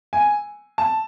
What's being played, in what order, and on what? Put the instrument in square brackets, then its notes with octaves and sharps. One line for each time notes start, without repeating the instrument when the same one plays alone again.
[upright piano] G#5
A5